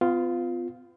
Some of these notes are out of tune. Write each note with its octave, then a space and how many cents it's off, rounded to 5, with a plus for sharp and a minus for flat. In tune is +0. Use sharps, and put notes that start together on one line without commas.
B3 +45 F4 +0